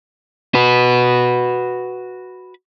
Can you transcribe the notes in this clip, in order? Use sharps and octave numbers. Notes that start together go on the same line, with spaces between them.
F#4 B4